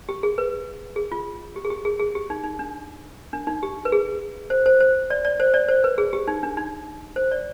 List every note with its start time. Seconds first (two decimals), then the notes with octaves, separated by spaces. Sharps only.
0.09 G4
0.23 G#4
0.38 B4
0.96 G#4
1.12 F4
1.56 G4
1.65 G#4
1.70 G4
1.85 G#4
2.00 G#4
2.15 G4
2.30 D#4
2.44 D#4
2.59 D4
3.33 D4
3.47 D#4
3.63 G4
3.85 B4
3.92 G#4
4.50 C5
4.66 C5
4.80 C5
5.10 D5
5.25 D5
5.40 C5
5.54 D5
5.69 C5
5.84 B4
5.98 G#4
6.13 G4
6.28 D#4
6.43 D4
6.57 D#4
7.16 C5
7.31 D5